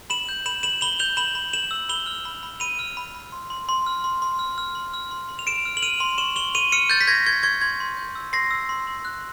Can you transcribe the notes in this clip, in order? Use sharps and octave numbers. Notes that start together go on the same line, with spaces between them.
B5 E7 F#7
G6
B5 E7 F#7
B5 E7 F#7
B5 F7 G7
G6 F7 G7
B5 E7 F#7
B5
B5 E7 F#7
E6
B5 F7 G7
F6
B5
B5
B5 D#7 F7
F6
B5
B5
C6
C6
C6
F6
C6
C6
F6
F6
C6
F6
C6
C6
F7
F6 D7 E7
F6
F#7
F6 D#7 F7
C6
C#6 E7 F#7
C#6 F7 G7
C#6 D#7 F7
F6 C#7 D#7
F6 G6 A6
B6
C#6 G#6 A#6
C#6 G#6
C#6 G#6
C6 G#6
C6
G6
E6
C6 A#6 C7
E6
C6
C6
F#6